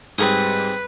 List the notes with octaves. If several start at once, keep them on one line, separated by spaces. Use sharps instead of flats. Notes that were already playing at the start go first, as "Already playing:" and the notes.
G#2 G3 C4 G#4 B4 D#6